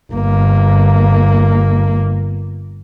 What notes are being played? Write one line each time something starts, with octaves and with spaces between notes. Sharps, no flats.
G1 A#3